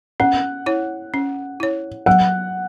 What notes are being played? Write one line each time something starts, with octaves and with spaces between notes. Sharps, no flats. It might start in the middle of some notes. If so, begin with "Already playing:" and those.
C#4 F#5
E4 C#5
C#4
E4 C#5
F#3 F#5